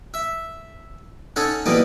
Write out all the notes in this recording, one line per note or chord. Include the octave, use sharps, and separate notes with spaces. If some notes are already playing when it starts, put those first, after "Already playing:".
E5
C#4 D#4 A4 C#5 F#5
B2 E3 G3 A#3 B3 D#4